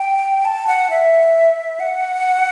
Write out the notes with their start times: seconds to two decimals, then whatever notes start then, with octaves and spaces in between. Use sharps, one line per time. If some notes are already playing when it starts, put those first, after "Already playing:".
Already playing: G5
0.45 A5
0.67 F#5
0.90 E5
1.80 F#5